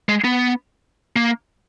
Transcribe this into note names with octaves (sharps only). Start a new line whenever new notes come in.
G#3
B3
A#3